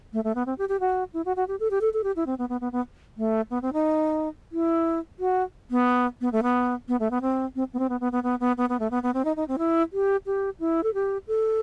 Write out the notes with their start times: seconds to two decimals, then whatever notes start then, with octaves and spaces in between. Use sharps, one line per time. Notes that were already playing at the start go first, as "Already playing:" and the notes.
0.13 A3
0.24 A3
0.35 B3
0.46 C4
0.58 G4
0.69 G4
0.80 F#4
1.14 E4
1.25 F#4
1.36 F#4
1.48 G4
1.60 A4
1.71 G4
1.81 A4
1.94 A4
2.04 G4
2.16 E4
2.26 C4
2.38 B3
2.49 B3
2.61 B3
2.72 B3
3.17 A3
3.50 B3
3.62 C4
3.73 D#4
4.52 E4
5.19 F#4
5.71 B3
6.21 B3
6.32 A3
6.43 B3
6.88 B3
7.00 A3
7.11 B3
7.22 C4
7.56 C4
7.73 B3
7.79 C4
7.89 B3
8.00 B3
8.12 B3
8.23 B3
8.40 B3
8.58 B3
8.69 B3
8.80 A3
8.91 B3
9.03 B3
9.14 C4
9.25 D#4
9.36 D#4
9.48 C4
9.58 E4
9.93 G4
10.26 G4
10.60 E4
10.83 A4
10.94 G4
11.28 A4